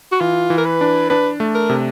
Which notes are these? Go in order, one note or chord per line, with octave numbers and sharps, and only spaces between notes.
F#4
E3 F4
E3
A#4
B4
D4
D4 B4
A3
A#4
C3